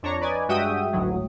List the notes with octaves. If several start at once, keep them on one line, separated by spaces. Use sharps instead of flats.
F2 D4 C#5 A#5 C#6
B4 D5 D#5 G#5
G2 G#3 F#4 E5 G5 D#6
G#1 D2 A2 F#3